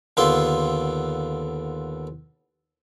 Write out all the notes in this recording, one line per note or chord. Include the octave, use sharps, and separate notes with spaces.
D#2 D3 B3 F4 E5 C6